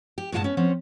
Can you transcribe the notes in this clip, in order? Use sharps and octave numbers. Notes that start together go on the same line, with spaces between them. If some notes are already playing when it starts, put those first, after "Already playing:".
G4
G2 A#2 G#3 F4 F#5 A5
B3 C#4
F3 C4 C#4 F#5